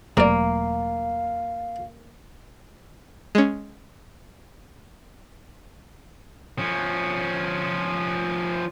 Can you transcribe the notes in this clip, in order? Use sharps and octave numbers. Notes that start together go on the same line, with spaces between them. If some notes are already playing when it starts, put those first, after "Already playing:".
E1 C3 F#3 A3 A#3 D5 F5
G#3 C#4
F3 C#4